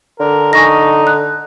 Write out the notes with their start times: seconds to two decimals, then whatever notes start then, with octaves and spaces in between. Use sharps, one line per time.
0.20 D3 A#4
0.53 D#4 G#5 C#6 A#6
1.07 F#6